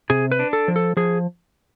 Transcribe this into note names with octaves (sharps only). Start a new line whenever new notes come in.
C3 G#4
B4
D4
A4
F3
A4
F3 G#4